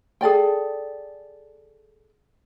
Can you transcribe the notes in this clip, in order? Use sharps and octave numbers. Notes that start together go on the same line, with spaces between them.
G#4 A4 D5 G5